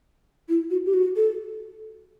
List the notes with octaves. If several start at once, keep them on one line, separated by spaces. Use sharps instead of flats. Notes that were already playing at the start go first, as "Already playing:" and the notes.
E4
F#4
G4
F#4
A4